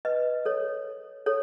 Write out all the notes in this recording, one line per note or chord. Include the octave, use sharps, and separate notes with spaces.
B4 D#5
A4 C#5
A4 C#5